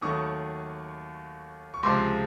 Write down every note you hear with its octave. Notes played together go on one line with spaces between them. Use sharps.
D#2 D#3 F#3 A3 C#6 D#6
C#6
C#2 C3 F3 G#3 C6 D6